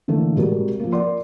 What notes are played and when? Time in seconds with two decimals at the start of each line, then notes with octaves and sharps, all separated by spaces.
0.08 D3 E3 A3 A#3
0.36 C3 G3 G#3 F#4 A#4
0.80 F3 A#3
0.92 A#4 D5 F#5 C6